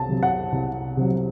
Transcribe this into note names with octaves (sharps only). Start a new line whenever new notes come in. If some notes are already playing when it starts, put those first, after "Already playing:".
Already playing: C2 A5
C3 F#3
F#5
C2
C3 F#3